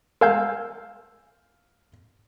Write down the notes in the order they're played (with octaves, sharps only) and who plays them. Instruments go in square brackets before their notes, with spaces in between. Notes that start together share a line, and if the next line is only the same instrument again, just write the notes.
[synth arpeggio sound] A#4 G#5 G6 [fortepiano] F5 E6